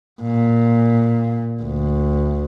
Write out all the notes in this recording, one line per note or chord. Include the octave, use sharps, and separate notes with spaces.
A#2
D2